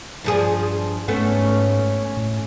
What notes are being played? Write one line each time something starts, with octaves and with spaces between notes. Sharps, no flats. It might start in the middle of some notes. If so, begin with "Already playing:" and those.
G2 F3 G#4
G#2 A3 B3 C#4
A2